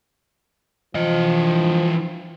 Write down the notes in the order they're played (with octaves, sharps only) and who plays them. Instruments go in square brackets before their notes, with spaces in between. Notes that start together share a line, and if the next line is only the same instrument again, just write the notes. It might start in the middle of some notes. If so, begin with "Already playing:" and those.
[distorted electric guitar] E3 D#5 [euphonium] F3